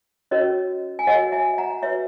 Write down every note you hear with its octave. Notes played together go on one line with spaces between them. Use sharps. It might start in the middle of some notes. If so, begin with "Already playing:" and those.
C#4 F#4 A#4 C#5 D#5
G#5
F#4 A#4 C#5 D#5 F#5
E5 G#5
F#5 A#5
F#4 B4 C#5 E5